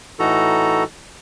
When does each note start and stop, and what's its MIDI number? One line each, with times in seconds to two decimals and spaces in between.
0.19 0.84 45
0.19 0.84 52
0.19 0.84 63
0.19 0.84 66
0.19 0.84 69
0.19 0.84 82